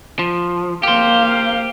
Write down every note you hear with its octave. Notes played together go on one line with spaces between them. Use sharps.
F3
A#3 G4 C5 F5